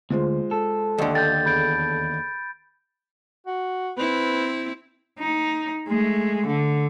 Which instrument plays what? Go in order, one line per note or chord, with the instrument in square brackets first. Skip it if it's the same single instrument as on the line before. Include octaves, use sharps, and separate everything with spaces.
[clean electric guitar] D2 [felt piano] G#3 F4 C5
[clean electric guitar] A4
[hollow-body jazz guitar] D#2 D3
[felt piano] G5 [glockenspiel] G6 A6
[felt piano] E2 [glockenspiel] B5 G6 D7
[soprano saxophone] F#4
[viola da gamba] C4 E4 [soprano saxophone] B4
[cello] D#4
G#3 A3
D3